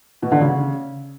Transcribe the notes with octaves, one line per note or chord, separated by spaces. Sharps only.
B2
D3
C#3